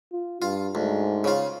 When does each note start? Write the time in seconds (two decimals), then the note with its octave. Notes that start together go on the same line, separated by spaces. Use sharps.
0.12 F4
0.42 G2 F4
0.75 D2 G#2
1.24 C#3 F4